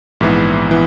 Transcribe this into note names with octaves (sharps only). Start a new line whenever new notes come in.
A#1 G#2 E3 B3 E4
E3 B3